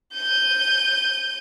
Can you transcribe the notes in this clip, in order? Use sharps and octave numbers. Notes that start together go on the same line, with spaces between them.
G6 D#7